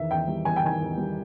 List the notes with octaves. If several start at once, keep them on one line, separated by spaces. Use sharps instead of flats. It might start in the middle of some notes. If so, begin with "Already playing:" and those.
Already playing: E2 D#3 E5
E2 G5
G3
E2 G#5
G5
D#3 G#5
E2
G3